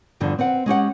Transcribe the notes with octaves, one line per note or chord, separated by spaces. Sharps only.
E2 G2 D3 F3
C4 B4 F#5
G#3 C#4 G4 F#5